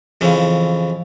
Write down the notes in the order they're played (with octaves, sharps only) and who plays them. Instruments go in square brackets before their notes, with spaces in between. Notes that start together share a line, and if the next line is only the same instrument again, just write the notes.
[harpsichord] F2 C#3 E3